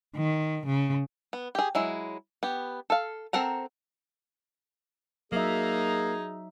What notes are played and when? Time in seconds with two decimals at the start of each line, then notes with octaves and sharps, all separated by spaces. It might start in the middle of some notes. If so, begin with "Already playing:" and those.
0.16 D#3
0.66 C#3
1.33 B3
1.55 G4 G#4
1.75 F#3 G#3 E4
2.43 B3 G4
2.90 A4 F5
3.33 C4 A4 A#4 F#5 A#5
5.32 F#3 A#3 D#4 G#4 E5